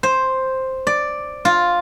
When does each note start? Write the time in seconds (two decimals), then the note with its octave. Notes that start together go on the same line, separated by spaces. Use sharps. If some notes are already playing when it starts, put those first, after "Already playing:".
0.03 C5
0.87 D5
1.45 F4